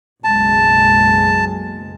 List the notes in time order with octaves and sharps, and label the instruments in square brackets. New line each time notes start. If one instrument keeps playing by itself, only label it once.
[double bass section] F#1 B1 G#3 [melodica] A5